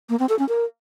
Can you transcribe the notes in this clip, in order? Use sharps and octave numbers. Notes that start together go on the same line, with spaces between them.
A#3
C4
A4
C#4
A#4